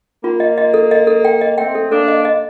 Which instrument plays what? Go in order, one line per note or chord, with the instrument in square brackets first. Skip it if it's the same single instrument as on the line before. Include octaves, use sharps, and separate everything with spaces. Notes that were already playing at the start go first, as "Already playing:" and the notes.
[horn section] A#3 [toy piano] F4
[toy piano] D#5
D#5
A4
D#5
A4
G5
D#5
[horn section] A3 C4 [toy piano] G5
[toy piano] A4
[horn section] A#3 D4 [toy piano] A4
[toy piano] D#5
D#5